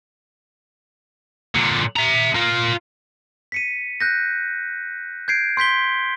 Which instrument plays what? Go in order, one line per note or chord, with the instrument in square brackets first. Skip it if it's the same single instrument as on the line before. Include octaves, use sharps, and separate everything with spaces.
[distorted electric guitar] A#2 D3
E5 A#5
F4 A#4
[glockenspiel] B6 C#7 D#7
F#6 G6 A#6
G6 G#6 C7 D7
C6 G6 B6 G7